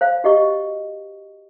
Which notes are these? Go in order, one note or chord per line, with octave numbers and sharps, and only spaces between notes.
C5 F5
F#4 G4 D#5 C#6